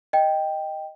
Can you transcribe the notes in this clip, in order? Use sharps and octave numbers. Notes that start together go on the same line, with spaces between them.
D#5 G5